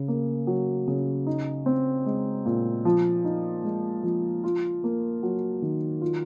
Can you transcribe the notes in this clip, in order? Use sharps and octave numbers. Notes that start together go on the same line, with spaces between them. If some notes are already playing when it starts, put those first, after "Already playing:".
Already playing: C#3
A#3
F#3
C#3
D#4
C4
G#3
A#2
F3
D#4
G#3
F3
F4
A#3
F#3
D#3
F4